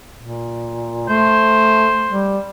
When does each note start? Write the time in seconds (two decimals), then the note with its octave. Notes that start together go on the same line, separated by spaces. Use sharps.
0.18 A#2
1.09 A3 C5
2.11 G3